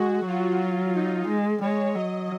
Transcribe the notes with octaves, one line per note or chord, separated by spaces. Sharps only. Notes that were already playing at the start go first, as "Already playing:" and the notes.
Already playing: G#3 F#4
F#3 F4
F4
D#4
G#3
G#3 C#5
F#3 D#5